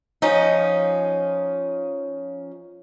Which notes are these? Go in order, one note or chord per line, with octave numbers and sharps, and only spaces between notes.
F3 C#4 D#4